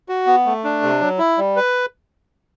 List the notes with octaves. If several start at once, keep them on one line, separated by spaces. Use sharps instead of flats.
F#4
B3
A3
D4
C3
F#3
E4
G3
B4